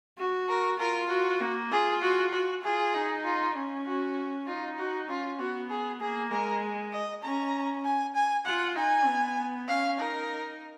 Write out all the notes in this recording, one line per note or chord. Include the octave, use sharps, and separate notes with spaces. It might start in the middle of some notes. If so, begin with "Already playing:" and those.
F#4
A#4
F4 A#4
F#4
A#3
F4 G#4
F#4
F#4
F4 G#4
D#4
F4
C#4
F#4
D#4 F4
F#4
C#4 F4
B3 F#4
G#4
A#3 G#4
G#3 A#4
D#5
C#4 A#5
G#5
G#5
F4 F#5
D#4 G#5
B3
C#4 F5
D#4 A#4